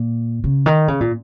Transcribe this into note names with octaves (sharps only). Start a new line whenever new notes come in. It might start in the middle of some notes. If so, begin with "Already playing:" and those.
Already playing: A#2
C#3
D#3
C#3
A#2